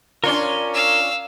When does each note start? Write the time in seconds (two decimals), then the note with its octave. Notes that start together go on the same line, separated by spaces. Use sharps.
0.24 C#4 D4 F4 A#4 C#5 C6
0.74 F5 E6